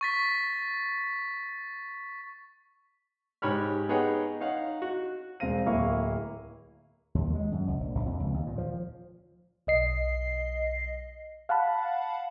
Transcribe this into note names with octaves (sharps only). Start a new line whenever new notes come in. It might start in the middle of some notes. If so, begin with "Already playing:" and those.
C#6 A6 B6
G#2 G4 C#5 B5 F6
B3 D#4 G#4 C#5 F#5 G5
D#4 C#5 F5 F#5
F#4
E1 C4 F5 A#6 D#7
D1 A#3 E4 F5 C#6
D#2
G#3
F#2
C#2
A#1
A#1
F2
C#2
D#2
A#2
F3
B1 D#5 C7
F5 F#5 A5 B5